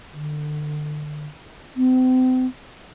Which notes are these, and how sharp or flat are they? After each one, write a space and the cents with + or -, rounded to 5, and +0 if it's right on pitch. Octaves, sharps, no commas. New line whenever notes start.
D3 +30
C4 -35